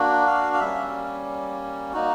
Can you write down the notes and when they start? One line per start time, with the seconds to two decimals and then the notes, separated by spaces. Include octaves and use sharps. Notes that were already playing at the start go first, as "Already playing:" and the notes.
Already playing: A#3 D4 F#4
0.27 F5
0.53 F5
0.60 G3 A#3 C#4 E5
1.93 A#3 D#4 F#4